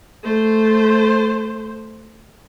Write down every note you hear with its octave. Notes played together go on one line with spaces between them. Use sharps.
A3 C5